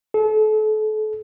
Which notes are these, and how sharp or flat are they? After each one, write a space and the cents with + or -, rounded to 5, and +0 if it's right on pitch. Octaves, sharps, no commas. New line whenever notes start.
A4 -35